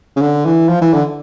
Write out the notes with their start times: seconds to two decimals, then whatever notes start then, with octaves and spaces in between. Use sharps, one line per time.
0.16 C#3
0.21 D3
0.45 E3
0.68 F3
0.81 E3
0.93 D3